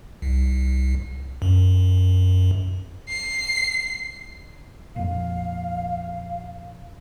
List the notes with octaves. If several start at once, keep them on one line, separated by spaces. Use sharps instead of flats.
C2
F#2
C7
A#1 F2 F5